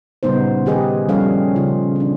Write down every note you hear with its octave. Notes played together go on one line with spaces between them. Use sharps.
A#2 C#3 G3 B3 D#4 C5
D#3 G4 G#4 B4 D#5
F3 G3 C#4 A4 C#5 F5
C#3 F4
C4 D4